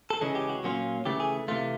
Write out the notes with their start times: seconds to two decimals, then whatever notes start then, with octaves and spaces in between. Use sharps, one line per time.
0.10 A4
0.21 C#3 E3 G#3 C#4 G#4
0.35 G4
0.49 F#4
0.64 A#2 F#3 A#3 C#4 F4
1.05 C#3 E3 A3 G4
1.20 G#4
1.48 C3 E3 A3 F4